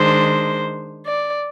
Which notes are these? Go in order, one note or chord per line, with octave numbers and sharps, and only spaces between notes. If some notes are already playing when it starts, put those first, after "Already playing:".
Already playing: D#3 G#3 D4 C5
D5